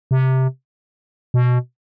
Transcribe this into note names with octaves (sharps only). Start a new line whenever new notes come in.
C3
B2